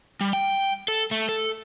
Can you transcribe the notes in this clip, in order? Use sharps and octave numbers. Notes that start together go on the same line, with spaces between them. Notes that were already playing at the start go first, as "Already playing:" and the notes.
G3
G5
A4
A3
A4